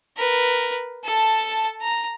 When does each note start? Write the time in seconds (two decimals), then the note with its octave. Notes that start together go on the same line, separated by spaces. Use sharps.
0.17 A#4 B4
1.04 A4 A5
1.82 A#5